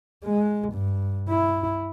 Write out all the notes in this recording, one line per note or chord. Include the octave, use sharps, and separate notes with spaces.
G#3
G2
E4